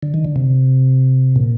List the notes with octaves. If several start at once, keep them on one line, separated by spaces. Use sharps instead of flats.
D3
D#3
D3
C3
A#2